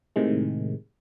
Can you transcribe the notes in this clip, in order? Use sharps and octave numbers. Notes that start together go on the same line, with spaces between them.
A2 C3 D#3 G#3